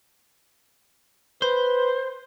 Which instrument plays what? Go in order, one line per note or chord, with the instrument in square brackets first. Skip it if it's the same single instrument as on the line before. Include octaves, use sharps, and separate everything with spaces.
[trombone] B4 [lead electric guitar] C5